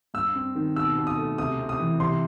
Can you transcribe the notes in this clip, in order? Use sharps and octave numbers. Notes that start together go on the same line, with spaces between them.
G2 E6
C4
D#3
B2 E6
B2
D#6
A3
C3 D#6
C4
D#6
E3
C3 C6